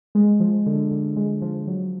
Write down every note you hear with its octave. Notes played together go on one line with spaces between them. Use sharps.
G#3
F3
D3
D3
G#3
F3
F#3